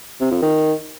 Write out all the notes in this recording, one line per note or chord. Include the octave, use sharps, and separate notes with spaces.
C3
F2
D#3